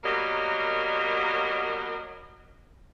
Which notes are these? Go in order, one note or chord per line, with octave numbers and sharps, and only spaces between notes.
B2 F#3 G3 A#3 A#4 D#5